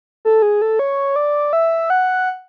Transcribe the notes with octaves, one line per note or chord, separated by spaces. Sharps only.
A4
G#4
A4
C#5
D5
E5
F#5